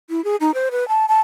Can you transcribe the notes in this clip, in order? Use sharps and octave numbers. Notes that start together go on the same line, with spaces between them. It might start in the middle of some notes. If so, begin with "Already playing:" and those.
E4
G#4
D#4
C5
B4
A5
A5